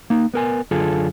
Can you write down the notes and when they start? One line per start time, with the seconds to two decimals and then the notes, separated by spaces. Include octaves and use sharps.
0.10 A#3 D#4
0.34 B3 A#4 G#5
0.71 F#2 D3 F4 G#4 A4